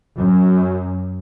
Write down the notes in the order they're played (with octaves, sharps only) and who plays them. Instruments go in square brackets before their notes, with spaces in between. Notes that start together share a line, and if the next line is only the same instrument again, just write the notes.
[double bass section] F#2